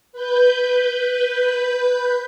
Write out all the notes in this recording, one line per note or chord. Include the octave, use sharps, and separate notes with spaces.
B4 G6